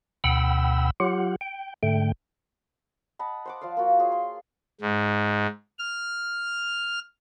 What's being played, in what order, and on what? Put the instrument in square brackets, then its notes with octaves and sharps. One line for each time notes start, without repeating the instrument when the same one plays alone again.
[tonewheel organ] D2 B2 F#5 G5 B5 E6
F#3 F4 G4 F#5
G5
G#2 D3 A3 G5
[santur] D#5 F#5 A5 B5
C5 F#5 D6
F3 C5 D5 F5
A#3 F4 F#4
F4 G#4 C#5
C6
[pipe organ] G#2
F6